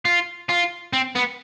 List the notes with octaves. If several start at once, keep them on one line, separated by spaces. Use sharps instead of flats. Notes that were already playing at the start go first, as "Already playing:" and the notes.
F4
F4
C4
B3